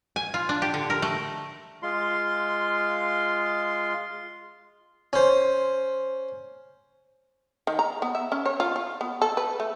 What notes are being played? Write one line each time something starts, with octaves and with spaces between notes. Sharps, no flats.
G#5
F4
D4
G4
D3
A#4
A3
G#3 F4 C6
C#4 C5
D#3
A#5
B3
E5
C#4
C#5
F4
F4
B3
A4
B4
A3